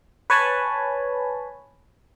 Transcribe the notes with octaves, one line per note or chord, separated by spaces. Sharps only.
B4 C#5 G#5 A5 B5